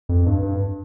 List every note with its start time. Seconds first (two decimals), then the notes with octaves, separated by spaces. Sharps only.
0.09 F2
0.26 G2
0.43 G2